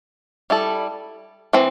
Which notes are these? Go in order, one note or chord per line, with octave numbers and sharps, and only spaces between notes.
G3 E4 A4
E3 C4